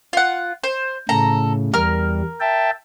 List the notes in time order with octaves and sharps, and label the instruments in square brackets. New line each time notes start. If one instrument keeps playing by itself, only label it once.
[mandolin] F4 F#5
C5
[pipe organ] A2 C#3 [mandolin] A4 A#5
[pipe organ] E2 G3 [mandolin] A#4 F6
[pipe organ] E5 G5 A5